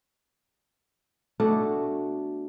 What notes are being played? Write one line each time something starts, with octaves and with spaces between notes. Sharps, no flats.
B2 A3 D4 F#4